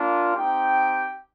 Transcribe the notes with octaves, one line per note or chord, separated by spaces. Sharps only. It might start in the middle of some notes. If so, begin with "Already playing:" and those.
Already playing: A#3 D4 F4
C4 D#4 G4 G5